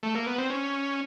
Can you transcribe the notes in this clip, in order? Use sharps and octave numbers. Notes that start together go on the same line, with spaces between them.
A3
A#3
B3
C4
C#4